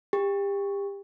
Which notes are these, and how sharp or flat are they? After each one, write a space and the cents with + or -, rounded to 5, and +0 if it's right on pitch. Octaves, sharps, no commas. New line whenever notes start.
G4 +30